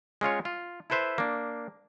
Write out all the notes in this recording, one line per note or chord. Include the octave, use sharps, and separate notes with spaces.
G#3 C#4 F4 C#5
F4
E4 A4 B4 C5 E5
A#3 D4